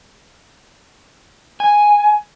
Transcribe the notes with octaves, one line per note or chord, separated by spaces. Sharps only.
G#5